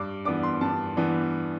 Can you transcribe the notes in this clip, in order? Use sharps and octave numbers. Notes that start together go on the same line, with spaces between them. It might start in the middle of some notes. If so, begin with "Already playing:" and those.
Already playing: G2 D6
E3 B3 D4 D6
C6
G2 A5
E3 B3 D4